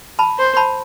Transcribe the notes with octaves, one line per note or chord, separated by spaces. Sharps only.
A5 B5
C5
A5 B5